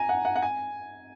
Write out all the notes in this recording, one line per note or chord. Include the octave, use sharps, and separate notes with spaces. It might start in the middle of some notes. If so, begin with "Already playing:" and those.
Already playing: G#5 A#5
F#5
F#5
F#5
G#5